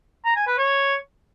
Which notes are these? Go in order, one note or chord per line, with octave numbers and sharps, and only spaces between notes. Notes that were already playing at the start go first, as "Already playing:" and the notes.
A#5
G#5
B4
C#5